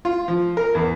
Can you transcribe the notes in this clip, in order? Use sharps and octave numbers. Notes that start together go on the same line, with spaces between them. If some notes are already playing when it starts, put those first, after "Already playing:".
F4
F3
A#4
E2